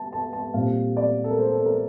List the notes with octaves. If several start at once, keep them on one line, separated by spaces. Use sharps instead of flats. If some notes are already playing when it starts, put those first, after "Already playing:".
Already playing: A5
A5
A5
A#2 G3 C4 F5
D5
A4
A#4
C5
A4
A#4